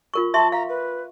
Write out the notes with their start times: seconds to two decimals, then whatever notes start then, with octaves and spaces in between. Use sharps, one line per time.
0.14 F4 A#4 C#6
0.34 E5 A5 C6 C#6
0.52 F5 A#5
0.69 B4